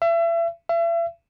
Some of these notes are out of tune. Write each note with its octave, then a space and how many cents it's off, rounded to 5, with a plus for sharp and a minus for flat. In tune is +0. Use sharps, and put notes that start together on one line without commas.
E5 +35
E5 +40